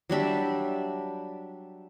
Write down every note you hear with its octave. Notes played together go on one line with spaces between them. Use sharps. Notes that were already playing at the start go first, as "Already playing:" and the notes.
F#3 G3 D4 E5